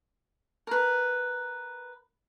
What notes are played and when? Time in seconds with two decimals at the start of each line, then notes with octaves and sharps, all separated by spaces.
0.67 A#4 B4